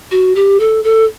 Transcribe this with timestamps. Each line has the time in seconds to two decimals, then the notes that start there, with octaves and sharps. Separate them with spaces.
0.11 F#4
0.35 G4
0.60 A4
0.84 A4